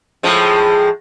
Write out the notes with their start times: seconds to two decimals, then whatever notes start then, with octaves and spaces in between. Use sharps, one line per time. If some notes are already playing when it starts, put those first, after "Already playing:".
0.23 A2 F3 G#3